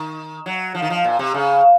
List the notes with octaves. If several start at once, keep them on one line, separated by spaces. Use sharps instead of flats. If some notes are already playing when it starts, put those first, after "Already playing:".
Already playing: D#3
F#3
F3
D#3
F3
A#2
C3
C#3